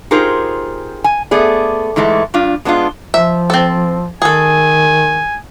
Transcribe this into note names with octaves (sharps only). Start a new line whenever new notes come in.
D#4 F4 G4 G#4 A#4 C5
G#5
A3 B3 G#4 D5
G#2 E3 G#3 A3
G2 D4 F4
G#3 B3 D4 D#4 F4
F3 E5
C4 A4
D#3 G#4 A4 G#5